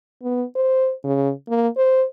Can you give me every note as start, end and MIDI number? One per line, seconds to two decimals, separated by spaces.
0.23 0.44 59
0.55 0.93 72
1.04 1.31 49
1.49 1.68 58
1.77 2.05 72